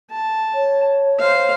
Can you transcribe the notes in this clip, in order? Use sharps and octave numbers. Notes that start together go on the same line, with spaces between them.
A5
C#5
C5 F5